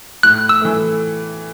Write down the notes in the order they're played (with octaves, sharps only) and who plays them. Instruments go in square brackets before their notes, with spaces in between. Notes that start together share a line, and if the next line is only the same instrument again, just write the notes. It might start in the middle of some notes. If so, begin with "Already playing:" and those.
[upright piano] A2 [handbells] F#6
[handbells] E6
[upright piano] E3 A3